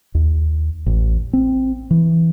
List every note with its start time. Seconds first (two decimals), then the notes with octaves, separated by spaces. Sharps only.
0.15 D#2
0.86 A1
1.33 C4
1.91 E3